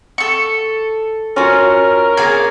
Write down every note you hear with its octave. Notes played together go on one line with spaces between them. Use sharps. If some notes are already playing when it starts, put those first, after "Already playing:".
A4 C#6
C#4 F4 F#4 A#4
A#2 A#3 G#4 G#5